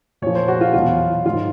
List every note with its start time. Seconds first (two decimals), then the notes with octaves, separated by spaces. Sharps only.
0.22 A#2 C#5
0.27 F3
0.35 C5
0.48 F#4
0.61 F4
0.73 E2 B2 F#3 F4
1.25 G#2 D#3 F#3 F4